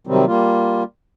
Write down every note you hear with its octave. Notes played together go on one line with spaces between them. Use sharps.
C3 D#3 F#3 G3 C4
G3 A#3 F4